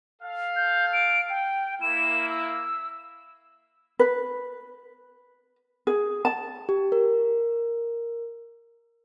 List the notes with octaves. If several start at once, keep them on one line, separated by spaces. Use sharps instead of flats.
A4 F5
G6
D7
G5
A#3 E4 E7
E6
B4
G#4
A5
G4
A#4